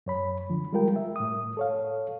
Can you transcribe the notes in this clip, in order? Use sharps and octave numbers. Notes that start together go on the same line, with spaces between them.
F#2 C#5 B5
D3 F3
G3 G#3 F4 A#4 G5
E5
A2 D#6
A4 C#5 F5